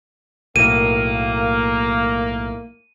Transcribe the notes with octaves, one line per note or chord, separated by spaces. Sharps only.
B1 A2 A#3 D#7